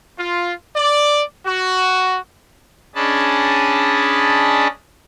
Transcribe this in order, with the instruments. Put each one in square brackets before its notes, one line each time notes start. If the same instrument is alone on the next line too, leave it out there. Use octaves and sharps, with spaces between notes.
[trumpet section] F4
D5
F#4
[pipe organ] C#4 D4 G#4 D#5 A5 B5